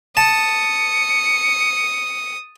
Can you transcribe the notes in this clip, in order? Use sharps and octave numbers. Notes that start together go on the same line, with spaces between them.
A5 D#6 C#7